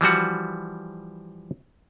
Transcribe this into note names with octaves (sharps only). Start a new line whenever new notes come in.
E3 F3 G3 F#4